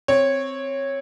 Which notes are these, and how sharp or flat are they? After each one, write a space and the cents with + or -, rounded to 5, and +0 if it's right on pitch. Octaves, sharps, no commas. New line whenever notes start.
C4 +0 C#5 -10